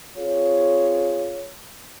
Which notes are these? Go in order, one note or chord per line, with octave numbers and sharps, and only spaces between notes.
C4 F4 G#4 C#5